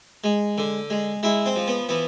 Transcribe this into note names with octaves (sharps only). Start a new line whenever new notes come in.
G#3
D3
G#3
G#3 E4
C4
F3
B3
E3 B3